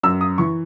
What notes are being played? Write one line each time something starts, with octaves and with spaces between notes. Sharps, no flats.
F#2 E6
D#6
E3 C#6